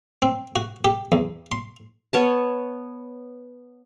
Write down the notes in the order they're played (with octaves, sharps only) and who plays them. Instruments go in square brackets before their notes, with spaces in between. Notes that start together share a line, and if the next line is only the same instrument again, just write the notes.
[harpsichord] C4
F#4
G4
E2
C6
[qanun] B3 C#5 A5